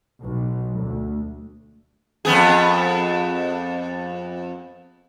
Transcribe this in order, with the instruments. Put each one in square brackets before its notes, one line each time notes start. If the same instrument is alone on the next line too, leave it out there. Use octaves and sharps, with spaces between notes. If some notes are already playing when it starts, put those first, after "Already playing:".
[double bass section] B1
D2
[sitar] F2 B3 G#4